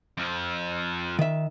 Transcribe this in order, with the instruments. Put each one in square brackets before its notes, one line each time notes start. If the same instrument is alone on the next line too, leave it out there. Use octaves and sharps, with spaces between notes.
[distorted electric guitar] F2 F3
[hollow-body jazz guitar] D#3 E5